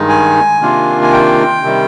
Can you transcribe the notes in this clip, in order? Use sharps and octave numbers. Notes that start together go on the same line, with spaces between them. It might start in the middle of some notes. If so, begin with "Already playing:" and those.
Already playing: G2 D#3 G#3 D#4
G#5
C3 D#3 A#3 D4 F4
G#5
G5
C3 D#3 G3